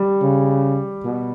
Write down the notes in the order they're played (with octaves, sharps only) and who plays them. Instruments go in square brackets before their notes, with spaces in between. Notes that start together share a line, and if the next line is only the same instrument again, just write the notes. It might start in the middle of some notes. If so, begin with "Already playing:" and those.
Already playing: [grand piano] G3
[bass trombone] C#3
B2